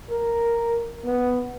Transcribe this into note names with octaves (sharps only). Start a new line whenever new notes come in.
A#4
B3